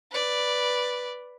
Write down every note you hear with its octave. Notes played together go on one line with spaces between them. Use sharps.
B4 D5